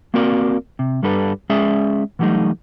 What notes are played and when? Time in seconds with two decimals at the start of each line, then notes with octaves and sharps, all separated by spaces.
0.14 A#3 C4 F#4 A#4 D5
0.79 C3
1.03 G2 G3 D4 A4 B4
1.50 G#3 C#4 G#4 D5 E5
2.19 E3 F#3 G3 A3 D#4